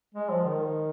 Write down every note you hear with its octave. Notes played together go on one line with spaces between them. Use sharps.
G#3
F3
D#3